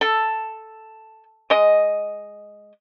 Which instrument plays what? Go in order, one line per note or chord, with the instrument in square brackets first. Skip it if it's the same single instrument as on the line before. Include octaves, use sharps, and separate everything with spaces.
[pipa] A4
G#3 D#5